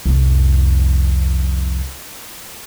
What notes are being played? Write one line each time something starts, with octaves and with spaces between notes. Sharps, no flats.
C2 F2